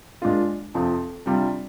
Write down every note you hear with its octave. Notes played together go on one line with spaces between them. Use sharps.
A#2 G#3 D4 F4
F2 C3 F3 C4
C3 G3 D4 F4